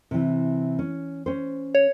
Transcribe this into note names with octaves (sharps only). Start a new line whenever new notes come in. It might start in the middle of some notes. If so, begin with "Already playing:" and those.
C3 E3
C#4
C#4 C5
C#5